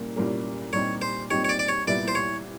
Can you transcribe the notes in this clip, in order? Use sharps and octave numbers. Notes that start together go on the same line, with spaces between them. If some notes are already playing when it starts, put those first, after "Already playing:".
Already playing: C2 A#2 G3 A#3 C#4
C2 A#2 G3 A#3 C#4
A#2 G3 C4 D#4 G4 C#5
C5
A#2 G3 C4 D#4 G4 C#5
C#5
D5
D5
C#5
C2 A#2 G3 B3 E4 D5
C5
C#5